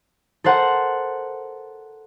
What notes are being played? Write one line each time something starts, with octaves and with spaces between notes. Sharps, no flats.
A4 A#4 C5 F#5